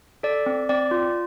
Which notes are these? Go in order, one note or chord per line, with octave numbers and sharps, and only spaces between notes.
A4 D5
C4
C4 D5
F4